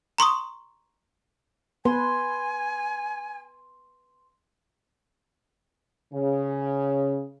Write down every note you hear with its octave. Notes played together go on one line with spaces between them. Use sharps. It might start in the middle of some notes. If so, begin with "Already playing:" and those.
A#5 C6 C#6 D#6
B3 B4 G#5 C6
C#3